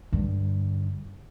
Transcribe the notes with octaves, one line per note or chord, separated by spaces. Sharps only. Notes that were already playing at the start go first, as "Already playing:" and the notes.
G2 D3